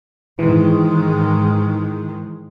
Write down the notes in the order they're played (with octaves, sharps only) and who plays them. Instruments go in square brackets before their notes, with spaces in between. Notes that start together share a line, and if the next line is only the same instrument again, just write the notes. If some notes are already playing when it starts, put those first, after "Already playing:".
[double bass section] G#2 D#3 G#3 [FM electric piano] E3